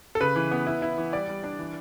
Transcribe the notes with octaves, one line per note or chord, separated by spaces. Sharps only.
A4
C#3 B4
E3
B3
E4
E4
E3
G3 D5
G3
D4
E3